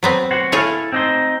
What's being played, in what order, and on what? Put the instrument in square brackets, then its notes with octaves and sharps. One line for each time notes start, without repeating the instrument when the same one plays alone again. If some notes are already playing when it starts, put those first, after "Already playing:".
[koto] F#3 B3 C4
[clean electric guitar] F#4 C5 F#5
[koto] A3 G#4 C#5 [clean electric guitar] E4 A4 F5
[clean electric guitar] C4 D#4 C5